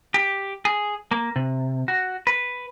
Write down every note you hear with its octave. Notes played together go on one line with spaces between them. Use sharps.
G4
G#4
A#3
C3
F#4
B4